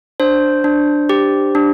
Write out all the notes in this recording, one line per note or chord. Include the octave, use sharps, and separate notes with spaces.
D4 C5
D4
G4
D4